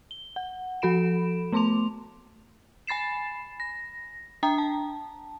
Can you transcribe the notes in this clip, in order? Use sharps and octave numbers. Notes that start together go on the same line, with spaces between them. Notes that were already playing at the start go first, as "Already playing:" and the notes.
G7
F#5
F3 F#4 A4 B5 D7 E7
A3 B3 A5 C6 D6 F7
G#5 B5 A6 C7 E7
A#6
D4 G5 A#5
A5